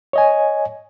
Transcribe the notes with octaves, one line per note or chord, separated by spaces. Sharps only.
C#5 D#5 G#5